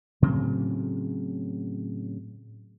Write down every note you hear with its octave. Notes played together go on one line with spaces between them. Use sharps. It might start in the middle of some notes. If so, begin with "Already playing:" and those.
A2 C#3 F#3 C4